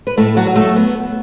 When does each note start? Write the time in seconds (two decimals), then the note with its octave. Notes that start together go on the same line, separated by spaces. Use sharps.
0.07 B4
0.17 A2 A3 A4
0.37 F#3 F#4
0.47 F#3
0.56 A3 A4
0.76 B3